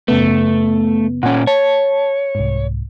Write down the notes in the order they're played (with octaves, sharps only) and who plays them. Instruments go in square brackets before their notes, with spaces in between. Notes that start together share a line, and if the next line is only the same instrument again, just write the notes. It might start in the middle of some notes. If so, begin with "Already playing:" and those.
[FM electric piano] F#2 C#3 B3 [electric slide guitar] A3
[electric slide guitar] A#2 C#4 [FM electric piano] F#5 G#5
[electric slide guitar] C#5 [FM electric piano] A5
[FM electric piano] C2 G#2